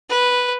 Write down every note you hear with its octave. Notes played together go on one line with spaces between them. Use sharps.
B4